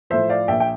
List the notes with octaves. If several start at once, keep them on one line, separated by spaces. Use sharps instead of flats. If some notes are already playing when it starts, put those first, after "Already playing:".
A2 F3 C5 E5
D5 F5
A#1 E5 G5
G5